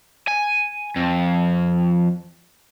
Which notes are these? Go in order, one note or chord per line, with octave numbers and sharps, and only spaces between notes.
G#5
F2